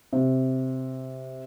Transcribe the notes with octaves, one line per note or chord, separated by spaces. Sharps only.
C3